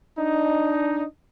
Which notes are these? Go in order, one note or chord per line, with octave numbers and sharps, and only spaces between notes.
D4 D#4